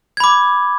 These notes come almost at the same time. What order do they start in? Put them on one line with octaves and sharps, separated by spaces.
G#6 B5 D6